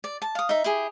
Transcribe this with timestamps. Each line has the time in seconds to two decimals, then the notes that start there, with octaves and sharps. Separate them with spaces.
0.04 D5
0.22 A5
0.35 F5 D#6
0.49 D#4 E5
0.64 E4 G4 G#4